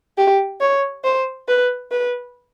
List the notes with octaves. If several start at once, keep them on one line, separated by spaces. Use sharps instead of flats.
G4
C#5
C5
B4
B4